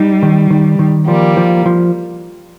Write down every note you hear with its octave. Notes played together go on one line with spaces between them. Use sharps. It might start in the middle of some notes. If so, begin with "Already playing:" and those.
Already playing: G3 D#4
D#3
D#3
D#3
F3 G3 A#3
F3
F3